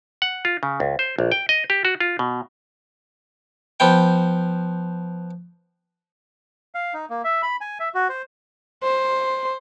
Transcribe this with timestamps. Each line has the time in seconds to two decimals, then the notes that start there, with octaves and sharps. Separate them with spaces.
0.22 F#5
0.45 F4
0.63 C#3
0.80 C#2
0.99 C5
1.18 A#1
1.32 G5
1.49 D#5
1.70 G4
1.85 F#4
2.00 F4
2.19 B2
3.80 F3 B3 G5
6.75 F5
6.94 D#4
7.10 A#3
7.24 E5
7.42 B5
7.61 G#5
7.80 E5
7.95 F#4
8.09 C5
8.84 C5